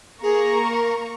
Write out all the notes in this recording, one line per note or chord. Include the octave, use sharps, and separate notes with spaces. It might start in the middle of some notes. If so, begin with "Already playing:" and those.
A#3 G#4 A#5 C#6
A#4